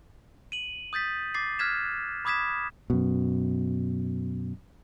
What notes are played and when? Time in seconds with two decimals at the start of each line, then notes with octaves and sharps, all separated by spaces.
0.52 D#7 F#7
0.93 D#6 G6 A6 B6
1.34 D6 A6 C7
1.59 F6 F#6 G#6 B6 E7
2.25 B5 D6 D#6 G#6 B6 E7
2.90 F#2 B2